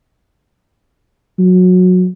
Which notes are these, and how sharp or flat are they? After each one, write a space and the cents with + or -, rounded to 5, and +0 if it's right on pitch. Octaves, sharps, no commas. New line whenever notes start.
F#3 -20